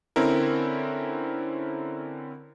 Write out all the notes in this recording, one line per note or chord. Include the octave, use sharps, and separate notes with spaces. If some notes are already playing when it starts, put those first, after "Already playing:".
D3 C4 C#4 E4 A#4